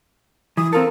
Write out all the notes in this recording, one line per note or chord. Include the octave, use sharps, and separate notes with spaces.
E3 D#6
C4 F4 A4 A#4